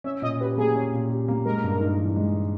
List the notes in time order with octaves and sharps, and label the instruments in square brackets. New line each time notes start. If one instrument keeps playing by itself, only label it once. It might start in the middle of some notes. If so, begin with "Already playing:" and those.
[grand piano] C#4 [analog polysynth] E5
[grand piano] A#2 [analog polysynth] D#5
[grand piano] G4 [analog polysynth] B4
[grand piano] A#3 [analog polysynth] G#4
[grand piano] C#4
A#2
G4
A#3
[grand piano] G#3 [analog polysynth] A#4
[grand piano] G2
D#4
E3
G#3